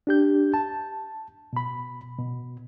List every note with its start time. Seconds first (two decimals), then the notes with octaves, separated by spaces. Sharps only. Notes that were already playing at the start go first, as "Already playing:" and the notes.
0.07 D4 G4 G6
0.54 A5
1.53 B2 B5
2.18 B2